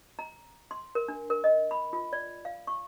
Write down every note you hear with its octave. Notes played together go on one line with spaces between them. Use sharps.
A#5
C6
A#4
D4
A#4
D#5
B5
F4
D5
F5
C#6